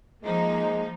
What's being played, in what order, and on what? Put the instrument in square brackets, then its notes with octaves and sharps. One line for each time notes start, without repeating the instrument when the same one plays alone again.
[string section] F3 A#3 D#4 [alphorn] G#3